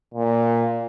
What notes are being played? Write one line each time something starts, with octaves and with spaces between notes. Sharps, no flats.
A#2